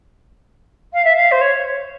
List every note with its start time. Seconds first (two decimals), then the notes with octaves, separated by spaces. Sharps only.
0.93 F5
1.04 E5
1.15 F5
1.31 C5
1.41 C#5